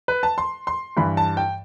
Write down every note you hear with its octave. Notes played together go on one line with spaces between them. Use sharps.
B4
A5
C6
C6
G2 E3 B5
A5
G5